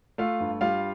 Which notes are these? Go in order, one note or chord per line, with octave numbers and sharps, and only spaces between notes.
A3 F4 F5
G2
G3 F4 F5